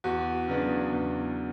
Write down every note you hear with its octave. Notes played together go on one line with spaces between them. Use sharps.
E2 F#4
C#3 F#3 B3 D4
E2